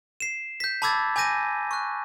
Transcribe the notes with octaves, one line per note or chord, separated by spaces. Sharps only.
C7 E7
G6 B6
A5 B5 D6 E6 G#6 A6
G#5 D6 G6 A#6 D#7
C#6 F#6